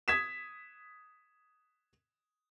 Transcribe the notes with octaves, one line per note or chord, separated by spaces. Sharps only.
D#6 G#6 B6 E7